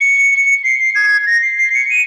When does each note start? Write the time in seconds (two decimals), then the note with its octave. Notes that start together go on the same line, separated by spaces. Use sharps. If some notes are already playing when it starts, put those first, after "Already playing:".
0.01 C#7
0.32 C#7
0.64 C7
0.79 C7
0.95 G#6
1.27 A#6
1.42 C7
1.59 C7
1.74 C#7
1.90 D#7